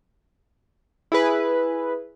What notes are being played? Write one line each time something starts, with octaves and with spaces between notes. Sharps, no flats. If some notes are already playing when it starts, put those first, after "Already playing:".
E4 G#4 B4